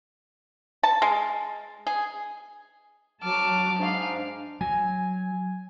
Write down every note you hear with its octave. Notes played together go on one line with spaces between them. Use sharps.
A5
G#3
G#4
F#3 A5 D6 F6
G#2 D4 F5
F#3 G#5